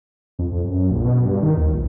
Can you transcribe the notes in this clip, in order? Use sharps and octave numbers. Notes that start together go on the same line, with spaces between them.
F2
F2
F#2
A#1
B2
G2
D#3
D#2
A#1